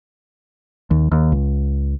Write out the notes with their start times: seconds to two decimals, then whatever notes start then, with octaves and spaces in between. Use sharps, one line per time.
0.91 D#2
1.12 D#2
1.32 C#2